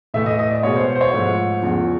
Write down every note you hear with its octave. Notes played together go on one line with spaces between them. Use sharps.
A2 E3 A3 E5
D#5
D#5
D5
B2 G#3 B3 C#5
C5
C5
C#5
G#2 F3 A3
E2 C#3 F3